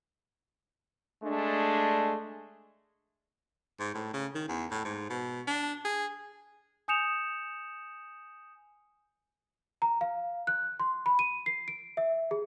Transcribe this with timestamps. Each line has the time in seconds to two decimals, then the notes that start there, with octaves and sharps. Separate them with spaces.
1.24 G#3 A3 D4
3.80 G#2
3.95 A2
4.13 C#3
4.35 D#3
4.48 E2
4.71 A2
4.85 G#2
5.10 B2
5.48 D4
5.85 G#4
6.88 G#5 D#6 G6 C#7 E7 F7
9.82 A#5
10.01 F5
10.47 F#6
10.80 C6
11.06 B5
11.19 D#7
11.46 C7
11.68 D7
11.97 E5
12.31 G#4